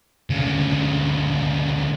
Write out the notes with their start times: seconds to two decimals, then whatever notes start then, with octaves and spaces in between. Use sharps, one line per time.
0.30 D2 C#3